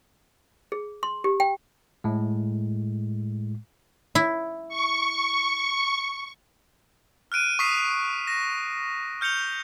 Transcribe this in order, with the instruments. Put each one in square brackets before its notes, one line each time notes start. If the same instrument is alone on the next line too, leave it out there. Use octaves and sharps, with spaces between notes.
[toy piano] G#4
C6
G4
G5
[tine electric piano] A2 G#3
[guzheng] E4
[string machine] C#6
[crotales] F6 F#6 D7 D#7
C#6 D#6 F6 B6 C7 E7
A#6 E7
F6 G6 C#7 F7 G7